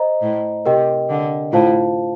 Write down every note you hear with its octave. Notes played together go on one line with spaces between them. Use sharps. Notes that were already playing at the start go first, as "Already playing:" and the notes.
Already playing: C5 D#5 A#5
A2
C3 G4 A#4 D#5 G5
D3
A2 F4 C5 F5 A5